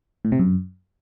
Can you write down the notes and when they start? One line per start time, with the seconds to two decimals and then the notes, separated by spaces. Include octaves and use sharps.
0.25 A2
0.32 C3
0.39 F#2